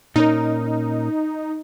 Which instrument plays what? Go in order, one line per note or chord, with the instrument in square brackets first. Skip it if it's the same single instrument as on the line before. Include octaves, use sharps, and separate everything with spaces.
[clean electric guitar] A#2 C#4 A#4 [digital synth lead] D#4